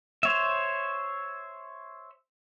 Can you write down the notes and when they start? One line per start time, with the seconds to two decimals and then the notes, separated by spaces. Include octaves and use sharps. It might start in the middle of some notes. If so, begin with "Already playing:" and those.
0.23 C5 C#5 E5